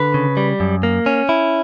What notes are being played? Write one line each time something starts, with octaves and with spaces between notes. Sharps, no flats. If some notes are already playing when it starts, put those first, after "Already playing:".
Already playing: D3 B4
C#3
G3
F#2
A#3
C#4
E4